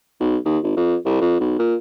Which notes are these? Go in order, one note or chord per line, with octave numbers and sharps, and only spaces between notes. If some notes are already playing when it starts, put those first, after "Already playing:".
B1
D#2
G#1
F2
C2
F2
B1
A#2